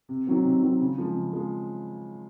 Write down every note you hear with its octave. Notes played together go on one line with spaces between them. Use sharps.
C3
D#3 F#3 C4
C3
D#3 F#3 C4
C#3
F3 G#3
C#3
F3 G#3